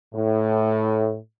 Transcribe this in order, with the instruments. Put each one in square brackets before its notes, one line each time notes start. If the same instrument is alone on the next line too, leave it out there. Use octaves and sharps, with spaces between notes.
[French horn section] A2